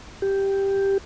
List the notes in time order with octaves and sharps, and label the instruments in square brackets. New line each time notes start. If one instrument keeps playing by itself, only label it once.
[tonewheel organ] G4